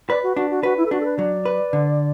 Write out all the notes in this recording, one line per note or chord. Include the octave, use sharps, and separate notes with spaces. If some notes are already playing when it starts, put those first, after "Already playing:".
B4 D5
F#4
D4 F#4
F#4
F#4 B4
E4
A4
D4 F#4
A4
B4
F#3 D5
B4
D3